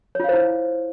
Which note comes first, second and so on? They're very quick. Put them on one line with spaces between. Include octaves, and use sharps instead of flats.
C#5 F4 F5 C5 E4